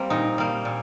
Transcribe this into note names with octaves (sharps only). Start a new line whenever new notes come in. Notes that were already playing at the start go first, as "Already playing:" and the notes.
Already playing: G3 A#3 C4
A#2 D#4
G3 A#3
A#2